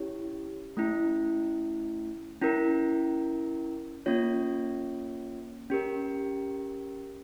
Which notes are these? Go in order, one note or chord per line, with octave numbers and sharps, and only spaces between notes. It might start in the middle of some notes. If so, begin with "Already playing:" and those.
Already playing: C#4 E4 G4 C#5
A3 C#4 E4
C#4 E4 A#4
A#3 C#4 F4 C#5
C#4 G4 A#4